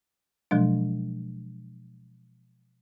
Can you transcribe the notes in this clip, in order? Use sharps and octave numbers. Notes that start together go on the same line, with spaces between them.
B2 F3 F#3 G#3 D4